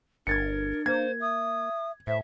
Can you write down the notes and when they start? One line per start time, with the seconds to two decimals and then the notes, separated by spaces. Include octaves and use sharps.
0.27 G1 D4 A#4 G#6 A6 C#7
0.86 A#3 C5 G#6
1.21 E5 D#6
2.07 A2 C5 E5